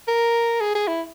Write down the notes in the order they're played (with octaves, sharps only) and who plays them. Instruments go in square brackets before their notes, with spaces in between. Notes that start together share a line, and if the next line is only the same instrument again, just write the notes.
[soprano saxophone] A#4
G#4
G#4
E4